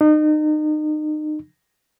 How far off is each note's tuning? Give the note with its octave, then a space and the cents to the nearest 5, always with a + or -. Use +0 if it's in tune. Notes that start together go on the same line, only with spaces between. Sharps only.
D#4 -35